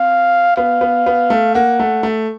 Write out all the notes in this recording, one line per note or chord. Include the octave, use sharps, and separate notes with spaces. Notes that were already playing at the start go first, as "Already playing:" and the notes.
Already playing: C4 F5
B3 F5
B3
B3
A3
A#3 F#5
A3
A3